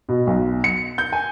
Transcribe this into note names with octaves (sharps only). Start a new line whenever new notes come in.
B2
B1
C#7
G6
G#5